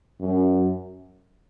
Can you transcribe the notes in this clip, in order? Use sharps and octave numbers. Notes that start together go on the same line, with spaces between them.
F#2